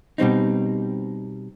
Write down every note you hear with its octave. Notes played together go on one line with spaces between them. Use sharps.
B2 G3 C4 D#4